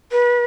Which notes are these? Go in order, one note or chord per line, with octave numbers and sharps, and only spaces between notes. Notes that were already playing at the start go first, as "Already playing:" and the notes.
B4